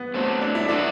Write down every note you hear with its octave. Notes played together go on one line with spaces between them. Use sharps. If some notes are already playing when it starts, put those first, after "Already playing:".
Already playing: B3
D3 F#3 A3 C4
D4
E4
D3 F#3 B3 D4 F#4